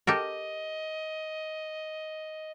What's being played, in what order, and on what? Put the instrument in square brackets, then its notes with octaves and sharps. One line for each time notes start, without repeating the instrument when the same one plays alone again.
[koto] G4 A4 A#4 [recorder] D#5